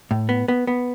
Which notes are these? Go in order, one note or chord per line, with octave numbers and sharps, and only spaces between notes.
A2
B3
B3
B3